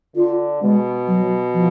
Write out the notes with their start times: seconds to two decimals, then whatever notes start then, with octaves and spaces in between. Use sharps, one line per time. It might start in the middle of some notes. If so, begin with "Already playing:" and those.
0.16 D3 F4
0.62 B2 G#3
1.08 F#3
1.54 F3